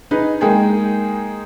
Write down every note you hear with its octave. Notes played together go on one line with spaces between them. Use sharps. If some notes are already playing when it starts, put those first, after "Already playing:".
D#4 G#4 B4
G#3 A#3 D#4 G#4 G5 G#5